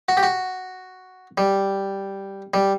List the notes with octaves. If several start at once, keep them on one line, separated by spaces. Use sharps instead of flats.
F#4
G4
F#4
G3
G3